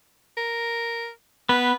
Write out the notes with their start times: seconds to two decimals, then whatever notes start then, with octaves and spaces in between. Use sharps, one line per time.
0.37 A#4
1.49 B3 B4